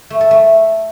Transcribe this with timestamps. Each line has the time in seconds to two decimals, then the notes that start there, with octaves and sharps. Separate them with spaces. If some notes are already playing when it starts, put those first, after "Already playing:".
0.10 A3
0.21 A4
0.31 A3